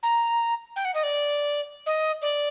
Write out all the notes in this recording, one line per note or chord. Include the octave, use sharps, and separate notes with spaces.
A#5
G5
F#5
D#5
D5
D#5
D5